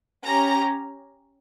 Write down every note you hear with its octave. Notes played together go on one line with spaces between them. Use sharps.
C#4 G4 A#5